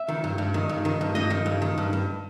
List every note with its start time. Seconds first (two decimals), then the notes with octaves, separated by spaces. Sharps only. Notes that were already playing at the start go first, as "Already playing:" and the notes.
Already playing: E5
0.08 D#3
0.24 G2
0.38 G2
0.54 D#3
0.69 G2
0.85 D#3
1.01 G2
1.15 G2 D#5
1.30 D#3
1.46 G2
1.62 D#3
1.78 G2
1.93 G2